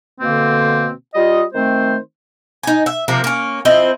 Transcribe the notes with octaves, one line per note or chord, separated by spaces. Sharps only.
B2 D3 A#3 C4
G3 F4 D#5
D#3 A3 C4 C5
D#4 G#5
E5
C3 F3 A#3
A#3 C#4
F3 C4 E4 D#5